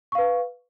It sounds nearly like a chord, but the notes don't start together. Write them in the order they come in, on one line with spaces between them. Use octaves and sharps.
C#6 F5 B4